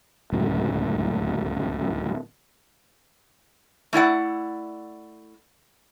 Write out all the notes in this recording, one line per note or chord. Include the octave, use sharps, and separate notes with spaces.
D1 C#2 F#2 A2
A3 E4 D5 F#5